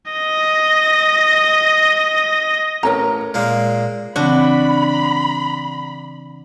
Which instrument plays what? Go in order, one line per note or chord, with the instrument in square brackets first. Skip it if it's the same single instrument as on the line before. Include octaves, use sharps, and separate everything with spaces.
[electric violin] D#5 A#6
[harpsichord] A1 [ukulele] A#4 C#5 A#5
[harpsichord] A#2 G#3 A#3
[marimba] C#3 E3 C4 [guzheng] D4 F#4 [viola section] B5